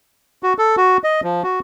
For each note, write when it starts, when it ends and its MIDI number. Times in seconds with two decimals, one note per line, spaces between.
0.43 0.53 66
0.58 0.76 69
0.77 0.97 66
1.04 1.21 75
1.24 1.43 53
1.44 1.60 66